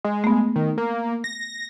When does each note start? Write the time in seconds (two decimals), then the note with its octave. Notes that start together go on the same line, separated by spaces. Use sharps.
0.04 G#3
0.24 A3 B3
0.56 D#3
0.78 A#3
1.24 A#6